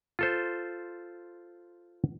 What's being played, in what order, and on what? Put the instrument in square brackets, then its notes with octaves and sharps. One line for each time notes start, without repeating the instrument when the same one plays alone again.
[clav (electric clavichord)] F4 A4 C5